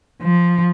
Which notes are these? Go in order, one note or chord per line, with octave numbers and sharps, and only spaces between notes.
F3